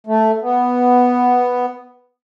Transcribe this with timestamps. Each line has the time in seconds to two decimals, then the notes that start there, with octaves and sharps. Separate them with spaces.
0.07 A3
0.41 B3